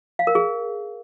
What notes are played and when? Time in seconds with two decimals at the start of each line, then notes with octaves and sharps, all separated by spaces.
0.19 F5
0.27 A#4
0.35 G#4